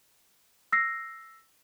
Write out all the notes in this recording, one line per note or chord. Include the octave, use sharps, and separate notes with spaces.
E6 A#6 C7